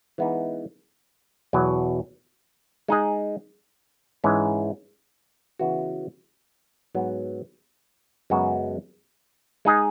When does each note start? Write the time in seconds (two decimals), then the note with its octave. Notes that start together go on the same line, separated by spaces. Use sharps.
0.18 E3 G#3 B3 D#4
1.53 E2 B2 F#3
2.88 G#3 D#4 G#4 D#5
4.24 G#2 E3 G#3 C#4
5.59 C#3 E3 B3 F#4
6.95 G#2 F#3 B3
8.30 F#2 C#3 G#3 B3 F#4
9.65 G#3 D#4 G#4 D#5